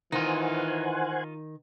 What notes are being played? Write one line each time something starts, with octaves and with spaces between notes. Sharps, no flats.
D#3 E3 D#4 F4 C5 F#5 G#5